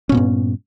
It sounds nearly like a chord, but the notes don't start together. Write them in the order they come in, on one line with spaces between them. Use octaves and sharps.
C#4 A#2 B3 G2